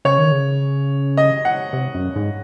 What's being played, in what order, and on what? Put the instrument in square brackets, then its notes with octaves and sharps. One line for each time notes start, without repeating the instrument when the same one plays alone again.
[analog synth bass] C#3 [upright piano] C#5
[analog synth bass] D#3
C#3
[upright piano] D#5
F#5
[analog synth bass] C3
F#2
G#2